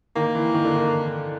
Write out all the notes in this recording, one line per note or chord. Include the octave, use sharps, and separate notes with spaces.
D#3 A#3
E3
D#3
D3
D#3